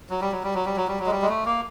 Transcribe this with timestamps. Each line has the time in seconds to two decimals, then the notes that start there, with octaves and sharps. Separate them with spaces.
0.09 F#3
0.21 G3
0.32 F#3
0.43 G3
0.54 F#3
0.66 G3
0.76 F#3
0.88 G3
0.99 F#3
1.06 G#3
1.11 G3
1.22 G#3
1.29 A3
1.46 A#3